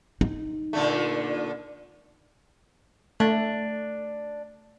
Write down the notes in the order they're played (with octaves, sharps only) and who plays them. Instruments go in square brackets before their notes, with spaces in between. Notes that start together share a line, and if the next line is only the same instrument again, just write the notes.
[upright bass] D#4
[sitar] A#2 D3 A3
[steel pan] A3 [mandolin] D4